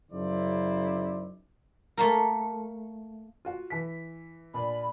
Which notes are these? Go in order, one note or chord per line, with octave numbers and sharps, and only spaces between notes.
F#2 C#3 D#4 E4 C5 D5
A3 A#3 A#4
F4 F#4
E3 B6
A#2 D4 B5